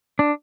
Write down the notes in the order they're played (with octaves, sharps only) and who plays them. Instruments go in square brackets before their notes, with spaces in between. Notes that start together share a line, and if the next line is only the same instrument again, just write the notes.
[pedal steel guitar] D4